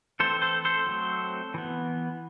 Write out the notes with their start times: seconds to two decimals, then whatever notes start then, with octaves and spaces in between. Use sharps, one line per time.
0.20 E3 A3 C4 A4 C5
0.42 A4 C5
0.65 A4 C5
0.87 F#3 A3 C4
1.54 E3 B3